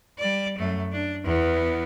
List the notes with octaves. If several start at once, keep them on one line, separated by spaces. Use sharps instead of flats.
G3 D5
F#2 A3
D4
E2 B3